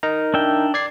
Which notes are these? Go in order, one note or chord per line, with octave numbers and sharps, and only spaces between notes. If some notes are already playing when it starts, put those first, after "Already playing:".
D#4 A#4 A#5
D4 E5 G5
D5 G#6 C7